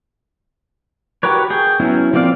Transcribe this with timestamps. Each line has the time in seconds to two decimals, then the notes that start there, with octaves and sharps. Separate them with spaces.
1.23 F#4 G4 A#4 B4 C#5
1.50 G#4 G5
1.80 F#3 B3 C#4 E4
2.13 F3 A#3 C4 D5 F5